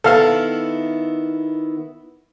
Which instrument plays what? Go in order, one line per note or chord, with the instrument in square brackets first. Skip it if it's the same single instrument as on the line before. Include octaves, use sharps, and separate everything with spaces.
[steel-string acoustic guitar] D#3 B3 E4 [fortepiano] A4 F5